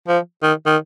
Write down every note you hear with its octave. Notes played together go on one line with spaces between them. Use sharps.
F3
D#3
D#3